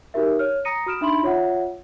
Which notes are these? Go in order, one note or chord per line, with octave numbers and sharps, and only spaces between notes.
D#4 F#4 G4 A#4 E5
C#5 F6
A#5 D#6 A#6 C#7 D#7
F#4 D#6 F6 D7 E7
D4 D#4 E5 B5 C6 F#7
F4 C#5 E5 F#5